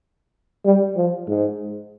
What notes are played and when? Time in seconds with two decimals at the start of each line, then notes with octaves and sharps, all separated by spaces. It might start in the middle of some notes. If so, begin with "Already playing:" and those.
0.65 G3
0.96 F3
1.27 G#2